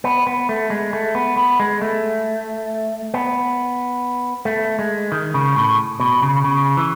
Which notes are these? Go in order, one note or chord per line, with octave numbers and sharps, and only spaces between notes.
B3
B3
A3
G#3
A3
B3
B3
G#3
A3
B3
A3
G#3
D#3
C#3
A2
B2
C#3
C#3
E3